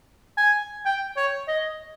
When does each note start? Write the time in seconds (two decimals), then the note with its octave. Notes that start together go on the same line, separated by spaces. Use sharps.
0.37 G#5
0.85 G5
1.17 C#5
1.48 D#5